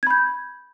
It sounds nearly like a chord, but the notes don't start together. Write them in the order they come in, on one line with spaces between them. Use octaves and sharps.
G#6 B5 G6